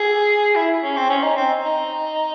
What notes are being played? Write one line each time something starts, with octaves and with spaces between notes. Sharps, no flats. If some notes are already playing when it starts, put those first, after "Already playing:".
Already playing: G#4
E4
C#4
C4
C#4
D#4
C4
D#4